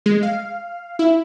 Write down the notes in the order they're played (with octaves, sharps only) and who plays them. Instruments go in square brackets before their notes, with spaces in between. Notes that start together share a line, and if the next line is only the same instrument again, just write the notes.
[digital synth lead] G#3
F5
E4